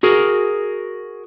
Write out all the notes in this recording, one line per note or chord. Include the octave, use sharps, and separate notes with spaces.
F#4 G#4 A#4